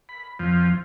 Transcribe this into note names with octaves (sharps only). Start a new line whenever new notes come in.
B5
F2 F3